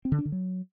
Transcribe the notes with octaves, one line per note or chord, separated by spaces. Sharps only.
C4
D3
D4
D3
F#3